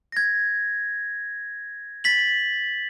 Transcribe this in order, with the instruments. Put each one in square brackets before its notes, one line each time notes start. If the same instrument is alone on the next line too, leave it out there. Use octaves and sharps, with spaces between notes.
[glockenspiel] G#6 A#6
A6 B6 F#7